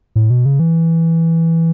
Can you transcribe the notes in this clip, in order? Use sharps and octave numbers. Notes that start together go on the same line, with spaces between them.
A2
B2
C#3
E3